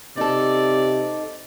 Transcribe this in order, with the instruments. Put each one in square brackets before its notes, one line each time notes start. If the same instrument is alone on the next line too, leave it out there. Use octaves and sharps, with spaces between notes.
[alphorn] C3 [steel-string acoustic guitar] D#4 A4 [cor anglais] D5